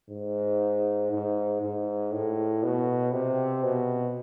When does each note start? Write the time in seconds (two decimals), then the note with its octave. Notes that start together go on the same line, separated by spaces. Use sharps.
0.10 G#2
1.12 G#2
1.62 G#2
2.13 A2
2.63 B2
3.13 C3
3.63 B2